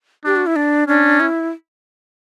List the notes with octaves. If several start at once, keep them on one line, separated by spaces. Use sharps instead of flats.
D4 G4
F#4
E4
D4
C#4 D4
E4